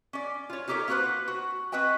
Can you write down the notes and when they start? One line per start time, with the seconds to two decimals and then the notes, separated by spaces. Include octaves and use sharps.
0.13 C#4 D5
0.50 F4 C#5
0.68 G3 D#4 G4 A4 A#4 C#5
0.88 A#3 C4 F#4 A4 B4 C5
1.28 F#4
1.72 C4 F#4 B4 D#5 G5